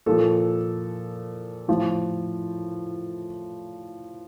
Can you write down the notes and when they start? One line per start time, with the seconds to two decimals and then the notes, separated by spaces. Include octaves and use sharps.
0.06 A#2 F3 A4
1.68 A2 F3